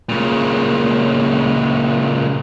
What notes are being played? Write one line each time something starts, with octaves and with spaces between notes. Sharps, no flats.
A#2 C#3